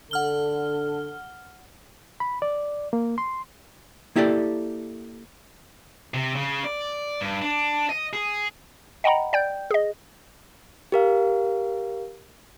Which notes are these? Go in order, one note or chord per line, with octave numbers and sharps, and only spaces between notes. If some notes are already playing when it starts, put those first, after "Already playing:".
D3 A4 F#5 F6 G7
B5
D5
A#3
C6
A#3 E4 G4 A4 D5
C3
C#3
D5
G2
D4
D#5
G#4
D#5 F#5 G5 A#5 B5
D5 G5 G6
G#4 D#5
G4 A#4 F5